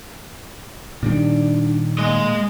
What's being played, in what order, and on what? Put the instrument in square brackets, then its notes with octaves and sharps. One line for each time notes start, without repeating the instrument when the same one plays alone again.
[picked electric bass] A#2 D#3 G3 [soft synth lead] D4
[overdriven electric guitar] G#3 D#5 [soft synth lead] A#3